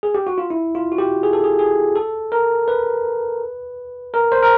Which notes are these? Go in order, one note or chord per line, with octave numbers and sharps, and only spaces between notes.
G#4
G4
F#4
F4
E4
F4
F#4
G4
G#4
A4
G#4
G#4
A4
A#4
B4
A#4
C5
A#4